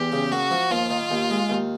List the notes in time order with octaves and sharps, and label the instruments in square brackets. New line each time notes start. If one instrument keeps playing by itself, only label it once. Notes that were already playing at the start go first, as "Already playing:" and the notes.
Already playing: [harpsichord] E2 [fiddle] G4
[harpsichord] C#3
[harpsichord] A#3 [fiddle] F#4
[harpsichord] F3
[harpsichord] D#2 [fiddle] F4
[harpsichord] D#3
D#2
G#3
D#2